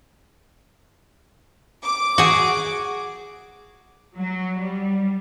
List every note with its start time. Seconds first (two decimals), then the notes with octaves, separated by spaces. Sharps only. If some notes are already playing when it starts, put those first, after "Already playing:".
1.83 D6
2.18 F#4 G#4
4.17 F#3
4.59 G3